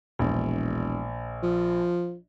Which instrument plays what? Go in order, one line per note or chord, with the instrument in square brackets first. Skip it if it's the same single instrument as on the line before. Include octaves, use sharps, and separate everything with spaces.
[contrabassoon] E1 [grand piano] A#1
[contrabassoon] F3